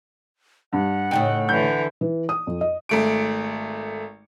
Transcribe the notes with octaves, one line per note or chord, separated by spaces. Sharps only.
G2 F#5
A2 C#3 D#4 G5
D3 E3 G6
E3
D#6
F2
D#5
G#1 A3 D7